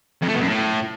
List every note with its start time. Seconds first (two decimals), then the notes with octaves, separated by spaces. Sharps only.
0.22 F2
0.28 A3
0.34 B2
0.41 F#2
0.47 A2